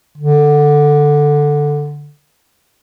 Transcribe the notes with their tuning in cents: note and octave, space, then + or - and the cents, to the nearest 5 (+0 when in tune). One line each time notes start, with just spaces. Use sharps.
D3 +5